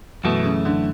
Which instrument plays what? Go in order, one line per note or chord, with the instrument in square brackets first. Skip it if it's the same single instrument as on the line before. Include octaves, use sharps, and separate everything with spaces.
[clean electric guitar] F#2 E3 A3 [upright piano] B2
[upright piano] C#3
D3